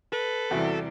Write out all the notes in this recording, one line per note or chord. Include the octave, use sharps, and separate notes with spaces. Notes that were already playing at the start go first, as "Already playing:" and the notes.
A4 B4
E2 C3 E3 G3 F#4 E5